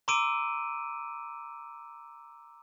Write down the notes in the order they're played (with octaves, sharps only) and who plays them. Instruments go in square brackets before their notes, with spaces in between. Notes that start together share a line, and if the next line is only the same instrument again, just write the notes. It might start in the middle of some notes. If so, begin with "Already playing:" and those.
[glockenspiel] A#5 C6 D6 E6 D7 D#7